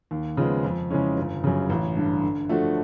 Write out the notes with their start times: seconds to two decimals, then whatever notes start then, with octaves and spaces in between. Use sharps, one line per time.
0.11 D#2
0.37 C#3 F3 G#3 B3
0.64 F2
0.90 C#3 E3 G#3 C#4
1.17 G1
1.44 F#2 C#3
1.70 A1
1.97 G2 D3
2.23 D3
2.49 F3 A3 D4 F#4